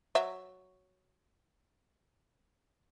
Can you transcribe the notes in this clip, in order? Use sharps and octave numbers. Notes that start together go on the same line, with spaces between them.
F#3 E5